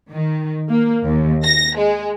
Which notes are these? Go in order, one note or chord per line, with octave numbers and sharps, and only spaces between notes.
D#3
A#3
D#2
A#6
G#3